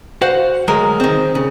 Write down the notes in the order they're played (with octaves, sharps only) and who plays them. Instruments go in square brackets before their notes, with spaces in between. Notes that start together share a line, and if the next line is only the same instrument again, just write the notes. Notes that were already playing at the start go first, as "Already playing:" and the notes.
[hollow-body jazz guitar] F#4 C5 F5 F#5
D2 F#3 G#3 A#4
D#3 C4
C#3